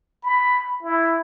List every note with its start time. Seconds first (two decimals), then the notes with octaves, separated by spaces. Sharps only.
0.23 B5
0.83 E4